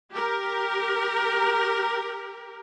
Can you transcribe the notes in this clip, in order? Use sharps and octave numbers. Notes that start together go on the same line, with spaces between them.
G4 A#4